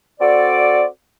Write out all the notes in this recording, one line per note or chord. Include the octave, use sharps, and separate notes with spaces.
C4 F#4 A4 D5